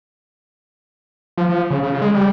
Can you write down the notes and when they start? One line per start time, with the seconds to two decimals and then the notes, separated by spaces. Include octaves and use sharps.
1.38 F3
1.49 F3
1.71 C#3
1.83 C#3
2.02 G#3
2.14 G3